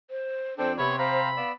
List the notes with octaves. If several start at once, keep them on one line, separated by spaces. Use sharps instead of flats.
C5
F2 C4 D4 A4 C5 G5
C3 B3 C#5 B5
C4 C5 F5 A#5 B5
B3 D5 F5 E6